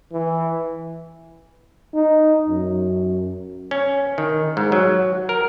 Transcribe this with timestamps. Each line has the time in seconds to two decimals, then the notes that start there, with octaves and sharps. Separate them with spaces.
0.12 E3
1.94 D#4
2.48 F#2
3.71 C#4
4.18 D#3
4.57 G#2
4.72 F#3
5.29 A#4